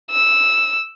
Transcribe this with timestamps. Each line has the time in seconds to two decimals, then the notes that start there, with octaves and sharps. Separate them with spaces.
0.11 E6